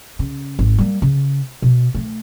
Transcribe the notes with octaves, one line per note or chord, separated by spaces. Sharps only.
C#3
G#1
G3 A#3
C#3
B2
D#3 A3